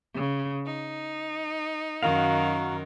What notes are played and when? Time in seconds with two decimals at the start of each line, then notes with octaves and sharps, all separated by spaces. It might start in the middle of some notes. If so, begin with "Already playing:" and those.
0.14 C#3
0.66 D#4
2.03 F#2 D#3 F#4 A#4 F5